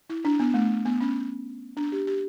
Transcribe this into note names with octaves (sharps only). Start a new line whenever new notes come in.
E4
D4
B3
A3
B3
C#4
D4
G4
G4